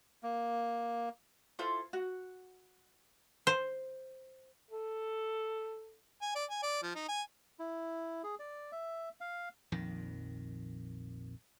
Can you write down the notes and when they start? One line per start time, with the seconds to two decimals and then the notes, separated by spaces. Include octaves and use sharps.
0.23 A#3
1.59 E4 F4 A4 C5
1.93 F#4
3.47 C5
4.71 A4
6.21 G#5
6.35 D5
6.50 G#5
6.63 D5
6.83 F3
6.95 D#4
7.08 G#5
7.59 E4
8.24 G#4
8.39 D5
8.72 E5
9.21 F5
9.72 A#1 F2 D#3